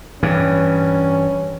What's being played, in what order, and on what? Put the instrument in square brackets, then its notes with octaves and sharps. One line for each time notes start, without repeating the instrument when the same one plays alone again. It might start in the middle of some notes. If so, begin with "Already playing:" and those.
[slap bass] G2 E3 [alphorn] C#4